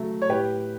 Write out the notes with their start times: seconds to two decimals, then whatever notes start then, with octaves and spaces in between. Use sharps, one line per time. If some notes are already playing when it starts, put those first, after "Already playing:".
Already playing: C#3 F#3 A3
0.22 C#5
0.29 A2 G4 B4